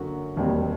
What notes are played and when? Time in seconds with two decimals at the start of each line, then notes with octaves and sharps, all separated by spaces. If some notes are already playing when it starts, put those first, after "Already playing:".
Already playing: F#2 D3 F#3 A#3 F#4
0.36 E1 D#2 D#3 G3 C4